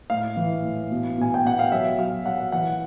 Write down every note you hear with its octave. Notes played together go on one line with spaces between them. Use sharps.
A2 F5
E3
A2
B2
B2 G#5
G5
B2 F#5
F5
F#3 E5
F#3 F5
F#3 F#5
E3 F#5